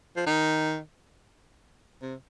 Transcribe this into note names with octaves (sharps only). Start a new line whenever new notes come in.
F3
D#3
C3